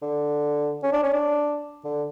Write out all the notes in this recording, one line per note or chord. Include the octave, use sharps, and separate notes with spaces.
D3
C#4
D4
C#4
D4
D3